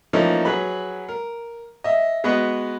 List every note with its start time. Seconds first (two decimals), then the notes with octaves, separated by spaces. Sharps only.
0.13 E3 F3 A3 A#3 C#4 D#4
0.45 F#3 G#4 B4 B5
1.09 A#4
1.84 D#5 E5
2.24 G#3 B3 F#4 B4 D#5